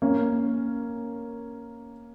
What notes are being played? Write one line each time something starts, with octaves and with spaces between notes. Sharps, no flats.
A#3 C#4